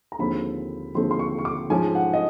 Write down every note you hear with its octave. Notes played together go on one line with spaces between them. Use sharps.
A#5
D#2 D3 F3 G#3 C4 B5
D#2 D3 F3 G#3 C4 C6
C6
C#6
C#6
D6
G#2 F3 G#3 C#4 G#5
F#5
D#5